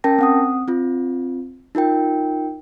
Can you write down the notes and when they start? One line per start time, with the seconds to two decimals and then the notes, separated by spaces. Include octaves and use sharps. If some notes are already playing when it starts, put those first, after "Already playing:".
0.04 C#4 A#4 G5 A5 A#6
0.19 C4 F#5 D#6
0.68 C4 F4
1.75 D#4 F4 A#4 G5